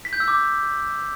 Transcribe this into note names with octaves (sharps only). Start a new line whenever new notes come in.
B6
G6
E6
D6